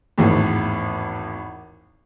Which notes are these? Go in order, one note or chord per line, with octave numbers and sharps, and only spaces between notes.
G#1 E2 A2